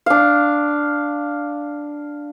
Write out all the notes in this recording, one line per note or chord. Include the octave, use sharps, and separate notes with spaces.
D4 F5